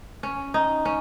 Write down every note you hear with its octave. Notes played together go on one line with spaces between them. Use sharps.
C#4
D#4
C#4